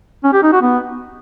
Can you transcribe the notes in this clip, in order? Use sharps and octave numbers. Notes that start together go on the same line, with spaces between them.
C#4
G4
D#4
F#4
B3